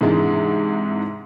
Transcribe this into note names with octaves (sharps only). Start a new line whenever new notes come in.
G#2 C3 E3 G#3 D4